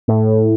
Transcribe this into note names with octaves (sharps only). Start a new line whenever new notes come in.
A2